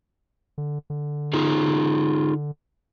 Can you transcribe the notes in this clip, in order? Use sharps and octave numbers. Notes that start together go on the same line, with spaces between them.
D3
D3
D#4 F4 G#4